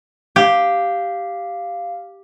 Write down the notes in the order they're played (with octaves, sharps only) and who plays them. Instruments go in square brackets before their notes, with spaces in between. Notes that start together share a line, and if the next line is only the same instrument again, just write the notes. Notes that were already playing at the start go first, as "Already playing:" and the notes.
[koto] G4 [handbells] F5